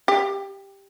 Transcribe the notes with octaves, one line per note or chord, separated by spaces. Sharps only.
G4